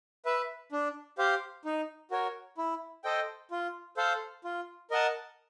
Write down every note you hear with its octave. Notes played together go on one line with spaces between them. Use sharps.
B4 E5
D4
G4 C5 F5
D#4
F#4 A#4 C#5
E4
A4 C5 D#5 G5
F4
A4 C5 F5
F4
A#4 D#5 F#5 A5